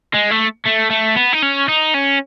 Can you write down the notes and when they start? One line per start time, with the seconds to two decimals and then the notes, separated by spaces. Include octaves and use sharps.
0.14 G#3
0.31 A3
0.66 A3
0.90 A3
1.16 B3
1.33 D#4
1.43 C#4
1.68 D#4
1.94 C#4